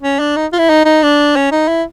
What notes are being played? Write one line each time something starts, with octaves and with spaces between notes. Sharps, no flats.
C#4
D4
D#4
F4
E4
D#4
D#4
D4
C#4
D#4
E4